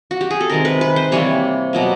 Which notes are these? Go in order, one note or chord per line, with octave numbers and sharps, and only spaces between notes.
F#4
G4
G#4
A4
C3 D#3 G#3 A#4
B4
B4
C5
C3 E3 G3 A#3 C#5
B2 F#3 A#3